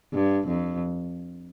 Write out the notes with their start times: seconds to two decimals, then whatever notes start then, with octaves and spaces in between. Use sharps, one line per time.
0.14 G2
0.48 F2